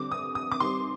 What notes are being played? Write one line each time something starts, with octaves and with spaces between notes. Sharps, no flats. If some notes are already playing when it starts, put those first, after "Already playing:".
Already playing: D3 G3 C4 D6
D#6
D#6
D6
D#3 G3 C4 C6